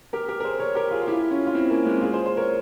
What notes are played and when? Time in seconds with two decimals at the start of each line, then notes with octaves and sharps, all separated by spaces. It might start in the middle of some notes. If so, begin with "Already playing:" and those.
0.13 G4 A#4
0.28 G4 A#4
0.40 A#4
0.44 G#4 C5
0.59 A#4 C#5
0.75 G4 A#4
0.91 F4 G#4
1.02 F4
1.07 E4 G4
1.31 C#4 F4
1.47 F4
1.54 C4 E4
1.70 A#3 C#4
1.85 G#3 C4
2.01 F4 G#4
2.13 G#4 C5
2.26 G#4 C5
2.37 A#4 C#5